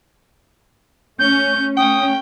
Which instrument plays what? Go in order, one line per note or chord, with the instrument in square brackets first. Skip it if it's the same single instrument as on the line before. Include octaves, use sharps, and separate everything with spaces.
[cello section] A3 C#4 [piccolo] G6
[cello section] A3 C#4 [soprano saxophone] G5 [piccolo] D#6